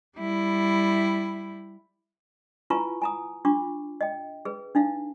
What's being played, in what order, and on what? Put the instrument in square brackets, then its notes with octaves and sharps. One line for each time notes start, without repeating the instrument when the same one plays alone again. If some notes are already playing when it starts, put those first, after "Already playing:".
[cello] G3 E4
[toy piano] E4 F4 B4 G#5 A#5 C#6
G#5 A#5 D#6
D4 F4 C#6 D6
D#5 G5
G#4 B4
D4 D#4 F5